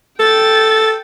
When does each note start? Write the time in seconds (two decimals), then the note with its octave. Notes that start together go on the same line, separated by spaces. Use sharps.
0.20 A4 G5 A6